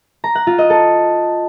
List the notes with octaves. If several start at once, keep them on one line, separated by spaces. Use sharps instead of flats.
A#5
F#5
F4
D#5
A4